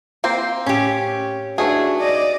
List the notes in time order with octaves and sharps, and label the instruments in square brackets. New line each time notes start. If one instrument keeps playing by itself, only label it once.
[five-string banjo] A#3 C4 C5
[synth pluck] A2 [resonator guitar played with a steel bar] C#4 G4
[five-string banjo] E3 A3 G#4 [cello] D4 [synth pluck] D#4 F#4 C#5
[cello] D5 D#5